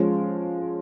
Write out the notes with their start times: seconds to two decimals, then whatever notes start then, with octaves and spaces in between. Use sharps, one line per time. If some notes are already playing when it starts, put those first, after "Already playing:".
Already playing: F3 G#3 C#4